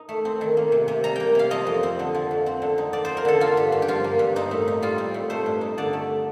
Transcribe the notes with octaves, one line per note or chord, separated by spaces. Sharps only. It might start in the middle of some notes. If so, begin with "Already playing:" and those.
Already playing: D#4
A3
C4
D#3
A#3
C3
C3
G3 A#5
A#3 G5
C3 F5
F3 D#5
F2
C4
D3
F3
F2
C4
D3
D#4
F3 D5
C4 C5
A#4
D3 A4
A#3 F4
G2
G2
G4
F3 F4
A#3
G2
C4 D#4
A2
D#4
G3 F4
C4
A2
A3 C5
G2
D#4
D3 D5
A3